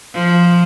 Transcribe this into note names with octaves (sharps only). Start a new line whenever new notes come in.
F3